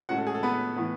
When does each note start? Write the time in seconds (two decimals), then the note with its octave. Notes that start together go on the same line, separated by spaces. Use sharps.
0.09 A2 G#3 C#4 F#4 F#5
0.18 A4
0.27 G#4
0.34 A4
0.43 B3 B4
0.77 A2 E3 B3